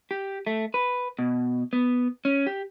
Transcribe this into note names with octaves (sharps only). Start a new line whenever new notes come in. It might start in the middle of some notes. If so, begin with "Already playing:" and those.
G4
A3
B4
B2
B3
C#4
G4